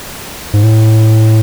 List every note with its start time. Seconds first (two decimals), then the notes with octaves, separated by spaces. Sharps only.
0.53 G#2
0.63 A2